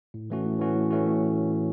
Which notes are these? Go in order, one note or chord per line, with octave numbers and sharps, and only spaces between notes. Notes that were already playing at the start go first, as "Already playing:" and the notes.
A2
E3 A3 C#4 F#4
A2
E3 A3 C#4 F#4
A2
E3 A3 C#4 F#4
A2